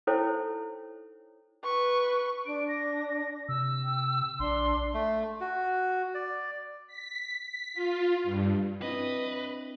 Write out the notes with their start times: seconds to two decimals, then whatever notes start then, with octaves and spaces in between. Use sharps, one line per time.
0.07 D#4 E4 A4 C5 C#5 G5
1.64 B4 C#6
2.46 D4 D7
2.68 A#6
3.49 C3 E6
3.83 G5
4.39 A#1 D4 C6
4.94 A3
5.41 F#4
6.15 D5
6.87 B6
7.41 B6
7.74 F4
8.24 G2
8.82 C4 D4 E4 B4 D#5